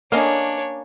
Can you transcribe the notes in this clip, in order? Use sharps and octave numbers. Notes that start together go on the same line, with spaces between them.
A#3 C#4 D4 C#5 D#5 F5